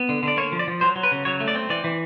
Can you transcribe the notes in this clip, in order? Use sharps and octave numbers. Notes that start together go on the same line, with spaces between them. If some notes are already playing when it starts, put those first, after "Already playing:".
Already playing: B3
D3
D3 D5
A#3 C#5
F3
D5
F3
F#3 C5
F#3
B4
C#3
F#3 C#5
A3
D5
C4
E3 D5
E3